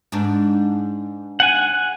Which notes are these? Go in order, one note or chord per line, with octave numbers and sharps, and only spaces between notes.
G#2 D4
F#5 G#5